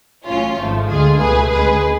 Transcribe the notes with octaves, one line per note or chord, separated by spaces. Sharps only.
A1 A2 F#3 C#4 F4
G#1 G#2 F3 A3
D2 D3 G#3 F4 G#4
C#2 B2 A3 G#4 B4
D2 C#3 G#3 G#4 B4